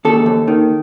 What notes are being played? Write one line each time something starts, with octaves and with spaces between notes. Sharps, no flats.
D#2 A4
D#2
D#3